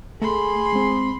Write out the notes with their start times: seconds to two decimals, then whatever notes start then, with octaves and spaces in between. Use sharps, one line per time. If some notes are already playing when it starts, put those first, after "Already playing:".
0.22 A3 G#4 B5 C6
0.72 G#3 C4